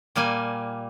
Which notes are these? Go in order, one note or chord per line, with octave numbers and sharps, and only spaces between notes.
A#2 G3 A#3 G#5